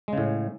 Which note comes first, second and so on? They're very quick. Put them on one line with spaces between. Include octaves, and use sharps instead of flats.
G#3 C#3 A2